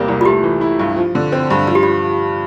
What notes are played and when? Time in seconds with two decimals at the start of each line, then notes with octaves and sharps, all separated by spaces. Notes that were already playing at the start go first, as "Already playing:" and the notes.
Already playing: E2 C3 G3 A#3
0.08 C2
0.21 F4
0.25 A3 G4
0.43 E3
0.61 E4
0.79 G2
0.96 F3
1.15 D3
1.32 C4
1.50 G2
1.68 F3 F4
1.75 G4
1.83 F4